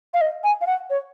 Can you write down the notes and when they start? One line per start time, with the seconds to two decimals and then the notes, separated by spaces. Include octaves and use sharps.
0.14 F5
0.21 D#5
0.44 G#5
0.61 F5
0.67 F#5
0.90 C#5